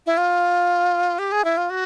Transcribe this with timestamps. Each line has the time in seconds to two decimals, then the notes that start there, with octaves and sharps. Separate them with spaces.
0.06 E4
0.17 F4
1.19 G4
1.32 G#4
1.45 E4
1.57 F4
1.70 F#4